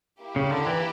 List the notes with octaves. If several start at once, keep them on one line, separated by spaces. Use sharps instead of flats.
A#3 E4 G4
C#3
D3
E3